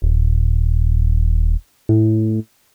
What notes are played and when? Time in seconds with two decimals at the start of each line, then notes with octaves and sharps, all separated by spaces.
0.02 D#1
1.89 A2